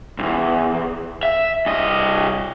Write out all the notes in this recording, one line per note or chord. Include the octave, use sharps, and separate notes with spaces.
B1 E2
E5
C2 D#5